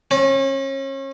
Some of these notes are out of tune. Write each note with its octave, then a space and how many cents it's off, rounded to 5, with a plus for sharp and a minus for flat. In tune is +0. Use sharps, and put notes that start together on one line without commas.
C#4 -35